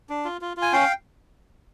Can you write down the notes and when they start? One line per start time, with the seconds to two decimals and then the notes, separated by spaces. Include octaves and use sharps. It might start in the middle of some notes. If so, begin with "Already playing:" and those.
0.09 D4
0.25 F4
0.41 F4
0.57 F4
0.62 G#5
0.73 C#4 F5 G5